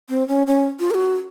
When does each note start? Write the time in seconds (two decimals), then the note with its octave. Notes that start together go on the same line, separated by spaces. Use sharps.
0.09 C4
0.28 C#4
0.47 C#4
0.80 F4
0.91 A#4
0.94 F#4